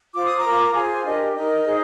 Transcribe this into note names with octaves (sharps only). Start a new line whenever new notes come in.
F4 C5 D6
D#6
A#5 D6
F4 A#4
F4 G#4 C5 G#5 C6
D4 G4 A#4 D#5
D#4 A#4 D#5
D#4 G#4 C5